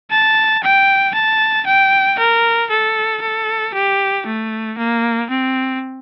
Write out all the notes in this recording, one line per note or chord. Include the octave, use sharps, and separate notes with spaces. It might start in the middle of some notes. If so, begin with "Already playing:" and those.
A5
G5
A5
G5
A#4
A4
A4
G4
A3
A#3
C4